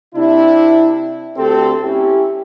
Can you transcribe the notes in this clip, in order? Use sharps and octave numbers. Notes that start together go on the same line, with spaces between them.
C3 D4 E4
D2 C4 G4 A4
C#4 E4 G4